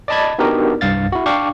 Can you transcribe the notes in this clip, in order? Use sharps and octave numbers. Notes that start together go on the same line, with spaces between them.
D5 D#5 A5 B5 G#6
B3 D4 D#4 F#4 G4 A#4
C2 G2 F5 A6
E4 F#4
D4 F5 G5 C#6 D6